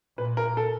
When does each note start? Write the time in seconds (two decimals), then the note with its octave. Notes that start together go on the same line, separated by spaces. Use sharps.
0.17 A#2 B4
0.37 A#4
0.57 A4